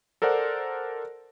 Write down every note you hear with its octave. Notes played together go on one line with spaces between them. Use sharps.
A4 A#4 C5 D5 F#5